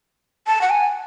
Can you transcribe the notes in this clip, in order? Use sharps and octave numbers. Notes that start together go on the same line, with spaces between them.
A5
F#5
G#5